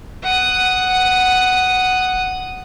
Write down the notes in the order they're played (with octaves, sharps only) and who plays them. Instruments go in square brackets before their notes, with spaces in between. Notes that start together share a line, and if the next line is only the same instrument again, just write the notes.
[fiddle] F#5 D#6